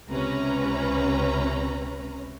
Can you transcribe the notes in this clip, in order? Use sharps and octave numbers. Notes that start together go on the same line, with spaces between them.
C#2 C3 C#4 B4 A#5